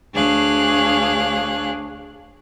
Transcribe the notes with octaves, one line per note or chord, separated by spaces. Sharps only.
D2 D4 G#4 C#5 F5 F#6